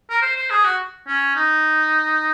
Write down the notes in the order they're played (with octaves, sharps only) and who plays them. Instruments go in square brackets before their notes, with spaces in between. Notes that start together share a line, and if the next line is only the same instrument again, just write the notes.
[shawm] A#4
C5
C5
G#4
F#4
C#4
D#4